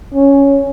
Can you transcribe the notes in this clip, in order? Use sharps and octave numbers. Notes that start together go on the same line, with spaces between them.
C#4